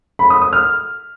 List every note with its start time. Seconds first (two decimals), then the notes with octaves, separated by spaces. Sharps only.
0.19 B5
0.30 D#6
0.42 D#6
0.53 F6